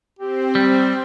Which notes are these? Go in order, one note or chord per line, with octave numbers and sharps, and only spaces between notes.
C4 G4
G3